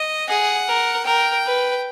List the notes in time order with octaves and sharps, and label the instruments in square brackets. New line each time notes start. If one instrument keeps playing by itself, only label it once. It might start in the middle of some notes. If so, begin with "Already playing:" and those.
Already playing: [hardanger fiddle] D#5
[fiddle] G#4 [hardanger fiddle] F#5
[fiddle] A#4
[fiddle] A#4 [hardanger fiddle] G5
[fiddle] B4